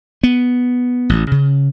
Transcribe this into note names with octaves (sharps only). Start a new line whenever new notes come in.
B3
A1
C#3